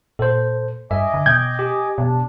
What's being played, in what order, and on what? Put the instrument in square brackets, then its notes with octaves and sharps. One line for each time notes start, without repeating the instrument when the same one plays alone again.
[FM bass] A#2 [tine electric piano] A4 C5
[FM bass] G2 [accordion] D#5 G#5 D6 [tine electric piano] E5
[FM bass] D3
[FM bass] B2 [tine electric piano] G5 G6 [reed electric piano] G#6
[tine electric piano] G4
[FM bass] B2 [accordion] D4